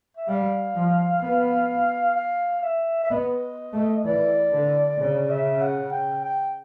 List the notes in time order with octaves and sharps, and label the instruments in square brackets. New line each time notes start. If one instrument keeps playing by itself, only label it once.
[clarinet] E5
[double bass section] G3 [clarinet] F5
[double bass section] F3
B3
[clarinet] F5
E5
E5
[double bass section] B3 [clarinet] D#5
[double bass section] A3
[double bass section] E3 [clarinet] D5
[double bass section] D3
[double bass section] C#3 [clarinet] D5
[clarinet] E5
F#5
G5
G5